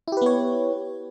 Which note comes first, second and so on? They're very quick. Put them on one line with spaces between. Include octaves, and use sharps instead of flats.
E4 G4 B4 B3 C#5